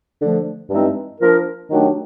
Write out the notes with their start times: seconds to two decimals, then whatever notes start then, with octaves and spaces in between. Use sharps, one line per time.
0.21 D3 F3 A3 D4
0.70 G2 E3 G#3 C4 D#4
1.21 F3 A#3 D4 F4 A#4
1.69 D#3 F#3 A3 D4 G4